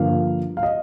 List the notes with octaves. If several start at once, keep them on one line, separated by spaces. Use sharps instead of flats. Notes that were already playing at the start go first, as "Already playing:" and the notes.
Already playing: G2 D3 F3 A#3 F5
F5
D#5